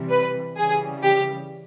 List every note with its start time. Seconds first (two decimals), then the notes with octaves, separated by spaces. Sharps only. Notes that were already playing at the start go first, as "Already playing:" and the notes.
Already playing: C3 E3 G3
0.09 B4
0.57 C#3 E3 G3 G#4
1.03 G4